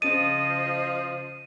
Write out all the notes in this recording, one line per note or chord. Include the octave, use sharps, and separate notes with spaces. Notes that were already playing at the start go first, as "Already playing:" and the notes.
C#3 F3 D#5 A5 A6 D#7